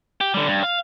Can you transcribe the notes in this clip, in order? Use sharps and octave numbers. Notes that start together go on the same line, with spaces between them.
G4
D3 G3
G2
F5